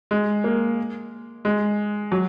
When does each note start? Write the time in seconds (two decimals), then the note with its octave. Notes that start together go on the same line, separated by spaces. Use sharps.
0.11 G#3
0.44 A#3
1.45 G#3
2.12 F#3